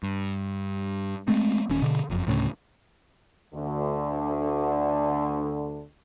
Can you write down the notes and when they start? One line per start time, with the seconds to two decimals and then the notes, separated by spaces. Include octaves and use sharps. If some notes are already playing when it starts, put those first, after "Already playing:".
0.03 G2
1.28 G#3 A3 C4
1.70 D#1 D#2 C#4
1.82 B2 D3
2.10 F#1 F2
2.27 D2 A2 C#3
3.54 D2 D3